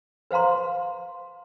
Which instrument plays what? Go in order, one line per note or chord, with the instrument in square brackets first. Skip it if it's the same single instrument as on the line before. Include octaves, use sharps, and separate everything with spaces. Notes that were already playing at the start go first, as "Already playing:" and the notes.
[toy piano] B4 C5 F5 A#5 C6